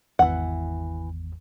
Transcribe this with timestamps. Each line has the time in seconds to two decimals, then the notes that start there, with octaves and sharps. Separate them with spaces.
0.19 G#1 E2 E3 F#5